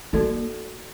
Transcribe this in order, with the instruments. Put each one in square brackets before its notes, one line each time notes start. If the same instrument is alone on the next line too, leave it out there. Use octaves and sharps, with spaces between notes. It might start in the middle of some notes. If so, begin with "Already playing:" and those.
[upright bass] A#3 [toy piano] D#4 F#4 A4 D5